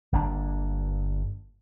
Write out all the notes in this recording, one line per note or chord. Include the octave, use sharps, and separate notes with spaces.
G1 A#3 D4